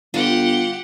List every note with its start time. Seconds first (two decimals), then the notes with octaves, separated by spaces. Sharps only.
0.14 G1 F4 G4 F#5